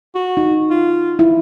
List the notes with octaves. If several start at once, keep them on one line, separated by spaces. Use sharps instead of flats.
F#4
D#4
F4
E4